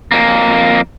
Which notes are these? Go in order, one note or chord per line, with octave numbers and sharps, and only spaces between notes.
F2 A#3